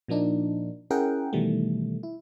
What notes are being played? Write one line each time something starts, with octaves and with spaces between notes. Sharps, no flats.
A#2 F3 A#3 D4 D#4
C#4 E4 G#4 A#4 F#5 G5
B2 D#3 E3 G3 A3
E4